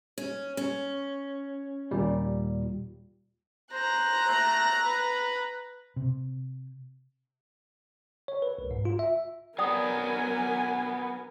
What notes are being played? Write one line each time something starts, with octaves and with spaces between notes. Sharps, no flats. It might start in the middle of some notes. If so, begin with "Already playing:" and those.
C#4
C#4
D#2 A#2 G3
C5 A#5 F#6
A3
B4
C3
C#5
B4
C2
G#2
F4
E5
F#3 B3 A#4 D5 G5 G#5 D#6